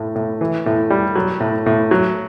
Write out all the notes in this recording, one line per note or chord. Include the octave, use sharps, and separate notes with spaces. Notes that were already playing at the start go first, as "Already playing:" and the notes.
Already playing: A2
A2
E3
A2
G3
F#3
A2
A2
F#3